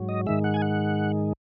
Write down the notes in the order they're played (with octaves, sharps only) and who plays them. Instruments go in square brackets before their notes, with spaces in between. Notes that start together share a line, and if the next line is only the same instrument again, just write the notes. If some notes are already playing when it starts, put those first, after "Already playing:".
Already playing: [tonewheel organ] G#2 F#3
D#5
G#2 D#3 G#3 E5
F#5
G#5
F#5